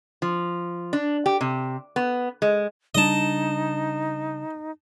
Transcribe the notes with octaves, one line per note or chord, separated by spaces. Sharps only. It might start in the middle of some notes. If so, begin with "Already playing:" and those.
F3
D4
G4
C3
B3
G#3
C#3 G3 D4 D#4 D#5 A5